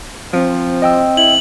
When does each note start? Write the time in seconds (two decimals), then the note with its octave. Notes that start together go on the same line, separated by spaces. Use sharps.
0.33 F3 C4
0.82 D#5 G5 E6
1.17 E4 F#7